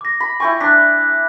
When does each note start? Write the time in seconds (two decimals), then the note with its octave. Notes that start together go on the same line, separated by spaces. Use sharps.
0.01 D6 A#6
0.20 B5
0.40 E4 G5 G#5 C#6
0.61 D4 F#6 B6